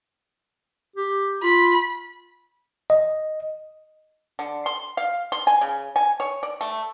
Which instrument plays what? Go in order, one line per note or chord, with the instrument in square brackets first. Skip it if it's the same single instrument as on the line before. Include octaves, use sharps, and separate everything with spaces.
[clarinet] G4
[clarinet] F4 [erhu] B5
[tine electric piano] D#5
[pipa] D3
C6
F5
C6
G#5
C#3
G#5
C#5
D5
A3